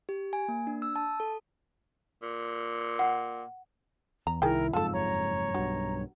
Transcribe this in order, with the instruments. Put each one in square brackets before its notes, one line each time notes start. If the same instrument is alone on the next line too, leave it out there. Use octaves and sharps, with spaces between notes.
[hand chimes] G4
G#5
A#3
D4
E6
A5
A4
[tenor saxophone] A#2
[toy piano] F#5
[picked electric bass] E2 [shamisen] A#5
[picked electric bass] C2 D#3 [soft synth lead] E4 [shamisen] G#4 G5 [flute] A#4
[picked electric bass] F#1 F2 G#2 [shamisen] F4 A4 [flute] A5 [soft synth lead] E6
[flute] C#5 [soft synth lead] A#5
[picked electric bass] B1 G2 [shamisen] F#4